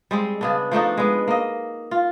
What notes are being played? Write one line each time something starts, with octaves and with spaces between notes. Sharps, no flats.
G3 G#3 C4
C#3 B3 D4
F3 A3 D4 D#4
G#3 B3
A#3 D#5
F4